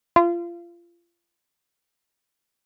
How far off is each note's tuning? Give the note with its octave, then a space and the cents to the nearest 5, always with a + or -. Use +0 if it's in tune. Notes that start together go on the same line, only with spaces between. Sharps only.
F4 -25